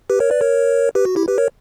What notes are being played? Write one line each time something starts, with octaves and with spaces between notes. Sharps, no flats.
G4 B4
A#4 C#5
B4 D5
A#4 C#5
G4 B4
F#4
E4 G4
G4 B4
A#4 C#5